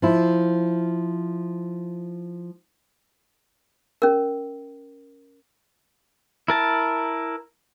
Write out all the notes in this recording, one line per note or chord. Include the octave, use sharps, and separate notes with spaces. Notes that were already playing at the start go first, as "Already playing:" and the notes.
F3 E4
C#4 A#4
E4 A#4 A5